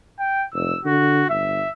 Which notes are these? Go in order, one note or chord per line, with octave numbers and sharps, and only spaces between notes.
G5
F1 E6
D3 F#4
G1 E5